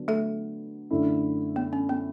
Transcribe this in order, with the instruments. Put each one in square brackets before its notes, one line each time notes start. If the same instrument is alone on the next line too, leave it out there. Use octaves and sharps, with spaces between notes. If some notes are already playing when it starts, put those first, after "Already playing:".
Already playing: [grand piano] D3 F#3 B3 D4
[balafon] A3 A4
[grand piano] F#2 D3 A3 E4
[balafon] B3
C#4
B3